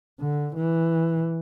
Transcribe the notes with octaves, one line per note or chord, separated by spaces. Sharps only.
D3
E3